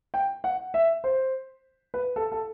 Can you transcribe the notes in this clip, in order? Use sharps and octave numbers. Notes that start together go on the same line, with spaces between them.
G5
F#5
E5
C5
B4
A4
A4